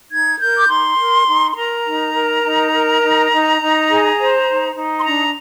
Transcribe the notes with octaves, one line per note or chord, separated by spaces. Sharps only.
D#4 G#6
A#4 G6
D6
D#4 C6
A#4
D#4
C6
A#4 A#5
D#4
A#4
D#4
A#4
D#4
D#4
D#4
G#4
C5
D#4
D#4
C6
D4 A#5